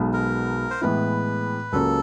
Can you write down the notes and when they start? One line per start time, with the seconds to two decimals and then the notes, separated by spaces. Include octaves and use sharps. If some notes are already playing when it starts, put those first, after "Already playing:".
Already playing: B1 B2 G#3
0.13 A#4
0.71 C5
0.81 A2 E3 G#3 B3 E4 B4
1.72 C#2 C#3 F#3 A#3 C#4 A4